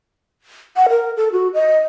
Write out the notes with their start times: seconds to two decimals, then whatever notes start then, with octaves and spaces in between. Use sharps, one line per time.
0.76 F#5
0.89 A#4
1.17 A4
1.32 F#4
1.54 D#5